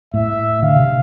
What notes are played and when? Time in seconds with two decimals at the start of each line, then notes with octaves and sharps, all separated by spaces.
0.14 A2 E5
0.62 D3 F5
0.76 C3